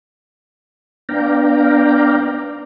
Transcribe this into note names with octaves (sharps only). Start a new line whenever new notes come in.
B3 D4 D5 F5 G5 A#5